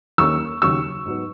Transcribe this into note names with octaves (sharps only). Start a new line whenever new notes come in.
D#2 D#3 A#3 C#4 C#6 E6
D#2 C#3 F#3 C#6 E6
G#2 F#3 B3